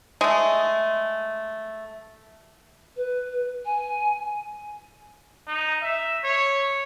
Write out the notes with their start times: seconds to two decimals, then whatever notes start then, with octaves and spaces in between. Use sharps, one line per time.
0.21 G#3 A3
2.96 B4
3.65 G#5
5.47 D#4
5.82 E5
6.23 C#5